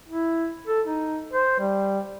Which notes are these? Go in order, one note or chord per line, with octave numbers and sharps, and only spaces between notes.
E4
A4
D#4
C5
G3